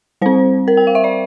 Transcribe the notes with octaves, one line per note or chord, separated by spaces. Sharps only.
G3 C4 C5
A#4
G5
F5
E5
D5